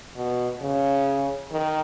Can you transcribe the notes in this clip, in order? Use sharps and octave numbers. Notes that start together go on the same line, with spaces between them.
B2
C#3
D#3